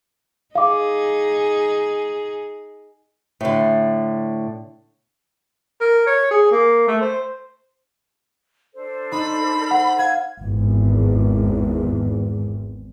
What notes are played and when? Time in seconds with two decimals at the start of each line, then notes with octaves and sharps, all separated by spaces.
0.55 D#4 G#4 F5 D6
3.41 A2 D3
5.81 A#4
6.06 C#5
6.31 G#4
6.52 A#3
6.88 A3
7.01 C5
8.74 D4 A4 C5
9.12 D#4 B5
9.71 F#5
9.99 F5 F#5 G#6
10.41 G#1 E2